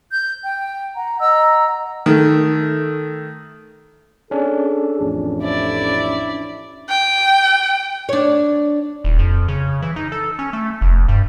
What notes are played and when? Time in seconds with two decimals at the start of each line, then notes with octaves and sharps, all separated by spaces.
0.10 G6
0.42 G5
0.95 F#5 A#5
1.20 D#5 F#5 A#5 E6
2.06 D#3 A3
4.31 C#4 D4 G#4 A4
5.00 A1 F2
5.42 E4 D5
6.89 G5
8.09 D4 C#5
9.04 D#1
9.19 F2
9.48 C#3
9.82 E3
9.96 D#4
10.12 A4
10.39 C#4
10.53 A3
10.81 F1
11.08 G2